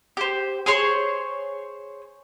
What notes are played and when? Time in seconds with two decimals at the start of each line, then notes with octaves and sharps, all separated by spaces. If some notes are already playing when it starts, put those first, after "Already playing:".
0.17 G4 C5
0.66 G#4 C5 C#5 C6